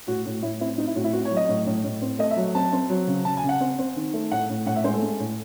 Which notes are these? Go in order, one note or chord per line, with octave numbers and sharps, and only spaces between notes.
A2 F#4
A2
A2 E4
C4 E4
C4 D#4
E4
A2 F#4
E4
C4 F#4
C#5
F#3
D#5
A2
A2
A2
C4
A3 D#5
E5
F#3
C4 A5
C4
F#3
C#3
C#3 A5
G#5
C#3
F#5
C4
C4
D#3
A3
A2 F#5
A2
A2 F#5
E5
G#3 C5
A4
G#3
A2